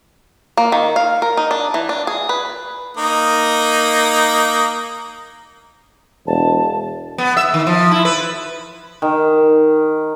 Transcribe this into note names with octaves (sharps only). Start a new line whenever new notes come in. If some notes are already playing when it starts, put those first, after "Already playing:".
A#3
D#3
F5
A#4
D#4
D4
E3
D4
G#4
B4
A#3 D#4 D#6
E1 A5
B3
E5
D#3
F3
E4
B4
D#3